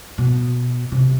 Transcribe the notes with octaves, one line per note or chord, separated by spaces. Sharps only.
B2
C3